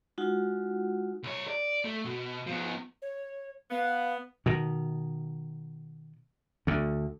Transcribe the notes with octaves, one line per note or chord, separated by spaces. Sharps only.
G#3 D#4 F4 F#4 F#5
C2 C#5
D5
A3
B2
F3 B3
C#5
B3 F5
B2 D#3
D2 D3